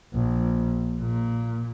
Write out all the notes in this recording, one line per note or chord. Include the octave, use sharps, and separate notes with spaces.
A#1
A#2